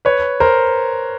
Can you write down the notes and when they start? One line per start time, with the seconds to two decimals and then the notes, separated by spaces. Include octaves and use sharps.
0.05 B4 C#5
0.40 A#4 C5